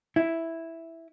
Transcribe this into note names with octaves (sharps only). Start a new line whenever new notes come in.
E4